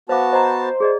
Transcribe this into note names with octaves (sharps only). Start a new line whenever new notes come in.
B3 F#4 C5 F5 A5 D6
C5 D#5 A#5
C5
G#4 D5 D#5